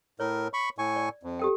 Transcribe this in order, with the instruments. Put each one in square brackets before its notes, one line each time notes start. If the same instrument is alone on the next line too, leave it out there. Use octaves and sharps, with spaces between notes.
[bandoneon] A2 A#4 [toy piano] C#5
[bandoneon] B5 C#6
A2 G#5 C#6
[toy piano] D5
[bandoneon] F2
[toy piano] G4 A4 G5